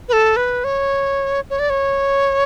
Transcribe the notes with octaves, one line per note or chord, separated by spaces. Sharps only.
B4
A4
B4
C#5
C#5
D5
C#5